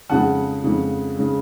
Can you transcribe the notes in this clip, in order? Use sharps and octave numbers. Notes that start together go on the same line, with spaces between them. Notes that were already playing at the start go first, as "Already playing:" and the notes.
F2 C#3 G#3 F#5 A5
F2 C#3 G#3
C#3 G#3